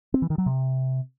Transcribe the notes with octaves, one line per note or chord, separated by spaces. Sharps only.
C4
E3
D#3
F#3
C3